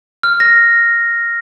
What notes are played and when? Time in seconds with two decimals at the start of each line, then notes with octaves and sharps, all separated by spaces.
0.23 F6
0.40 A#6